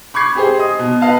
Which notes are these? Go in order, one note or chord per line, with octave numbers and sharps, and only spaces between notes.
B5 C#6 D6 G#6 C7
G4 G#4 C5
D#5 D#6
B2
B4 D#5 F5 A5